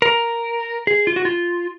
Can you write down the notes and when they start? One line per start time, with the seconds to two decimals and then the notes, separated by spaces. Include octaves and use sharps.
0.02 A#4
0.87 G#4
1.07 F4
1.16 F#4
1.25 F4